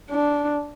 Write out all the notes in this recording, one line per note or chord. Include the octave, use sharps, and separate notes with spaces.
D4